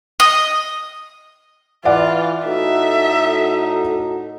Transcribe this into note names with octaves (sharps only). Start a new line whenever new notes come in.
D#5
E3 F4 D5 F#5
A2 D#4 F#4 A4 E5